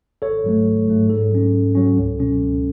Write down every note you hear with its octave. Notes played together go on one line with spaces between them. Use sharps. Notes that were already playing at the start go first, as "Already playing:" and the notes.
G#1 A4 C#5
G#2 F#3 A3
G#1
G#2 F#3 A3
G#2 A4
F#3 C#4
G#2
F#3 C#4
C#2
B2 F#3 C#4
C#2